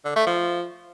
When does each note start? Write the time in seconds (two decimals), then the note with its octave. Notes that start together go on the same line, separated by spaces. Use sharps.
0.05 D3
0.16 A3
0.27 F3